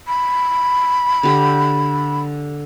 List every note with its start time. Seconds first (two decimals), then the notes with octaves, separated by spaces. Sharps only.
0.07 B5
1.23 D3 G4